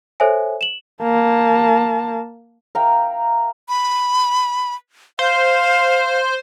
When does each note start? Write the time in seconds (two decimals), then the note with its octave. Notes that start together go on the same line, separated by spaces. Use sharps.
0.20 A4 C5 C#5 E5 G#5
0.61 E7 F#7
1.02 A#3 A5
2.75 A#4 E5 F5 G5
3.69 B5
5.19 C5 F5